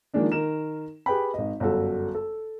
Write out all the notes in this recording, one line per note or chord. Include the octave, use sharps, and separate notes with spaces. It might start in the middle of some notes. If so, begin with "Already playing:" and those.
D#3 F3 G#3 A#3 D4 D#4
D#3 A#4 E7
G4 G#4 B4 G5 B5
G#1 D#5
G1 F#2 F#4 A4
A4